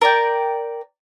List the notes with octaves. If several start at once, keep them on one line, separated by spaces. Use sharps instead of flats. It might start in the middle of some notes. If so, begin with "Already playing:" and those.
A#4 D5 G5